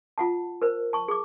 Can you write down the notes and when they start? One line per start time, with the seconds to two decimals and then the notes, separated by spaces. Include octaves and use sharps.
0.18 F4 F#5 A5
0.62 A#4 C5
0.93 A5 C#6
1.08 G#4 D6